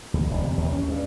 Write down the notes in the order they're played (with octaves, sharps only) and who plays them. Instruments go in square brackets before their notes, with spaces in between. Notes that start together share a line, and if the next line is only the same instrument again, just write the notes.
[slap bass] D2
E1
C3
D#2
C#4
G2